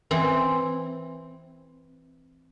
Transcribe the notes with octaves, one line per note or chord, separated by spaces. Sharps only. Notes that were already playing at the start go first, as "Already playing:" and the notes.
E3 C4 E4